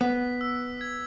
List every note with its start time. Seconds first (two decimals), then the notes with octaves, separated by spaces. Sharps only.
0.01 B3 B6
0.41 E6
0.81 G#6